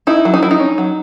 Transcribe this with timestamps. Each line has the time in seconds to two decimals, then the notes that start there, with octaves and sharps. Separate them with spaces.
0.07 D#4 E4
0.25 F#3
0.34 D#4
0.43 F#3 E4
0.51 D#4
0.60 C#4
0.78 F#3